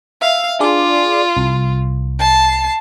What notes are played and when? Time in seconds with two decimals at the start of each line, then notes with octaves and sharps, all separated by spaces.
0.22 E5 F5
0.60 D4 F4 G#4 D5
1.37 C2
2.19 A5 C7